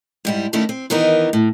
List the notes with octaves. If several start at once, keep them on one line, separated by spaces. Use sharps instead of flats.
G#2 G3 E4
D#3 A3 C#4 D4 E4
C4
D#3 E3 B3 D#4 A#4
A2